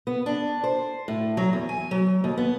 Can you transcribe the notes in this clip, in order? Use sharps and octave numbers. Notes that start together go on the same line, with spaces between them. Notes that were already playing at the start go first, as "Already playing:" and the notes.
B3
D4
C5
A2
F#3
E2
G#5
F#3
D#2
B3